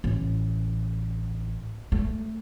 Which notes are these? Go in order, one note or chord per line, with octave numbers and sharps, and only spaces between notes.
A1
A3